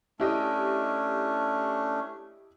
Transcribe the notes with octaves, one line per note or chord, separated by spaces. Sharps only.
A3 C#4 D4 E4 G4 D#5